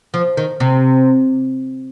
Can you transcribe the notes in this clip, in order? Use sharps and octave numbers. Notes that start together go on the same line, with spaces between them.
F3
D#3
C3